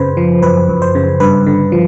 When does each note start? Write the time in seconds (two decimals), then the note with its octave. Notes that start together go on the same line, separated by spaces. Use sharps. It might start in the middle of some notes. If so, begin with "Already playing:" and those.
Already playing: F#2 C#3 B4 C5
0.17 F3
0.42 F#2 B4
0.69 F#2
0.82 C5
0.95 C#3
1.20 G2 B4
1.46 D3
1.72 F3